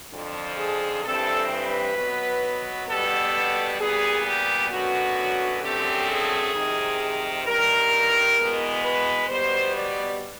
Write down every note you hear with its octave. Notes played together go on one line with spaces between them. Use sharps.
F2 D3 F3
G#4
G2 E3 G3 C4 A4
B4
B2 F#3 B3
B2 G3 B3 A4
A#2 G3 B3 G#4
G4
F#2 D3 F#3 B3 F#4
F#2 D3 F3 A3 C4 G4
G#4
F2 C3 D#3
G2 D#3 G3 A#4
E2 B2 G#3 B3
B4
B2 G3 B3 C5
D5